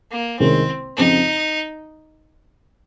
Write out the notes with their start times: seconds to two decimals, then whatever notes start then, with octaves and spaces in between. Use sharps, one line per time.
0.11 A#3
0.39 C2 C3 D#3 G#3 C4 C#4
0.97 F2 C#3 F3 C4 D#4